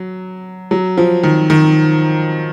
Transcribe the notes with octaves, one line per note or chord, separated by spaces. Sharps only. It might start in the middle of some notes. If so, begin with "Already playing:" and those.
Already playing: F#3
F#3
F3
D#3
D#3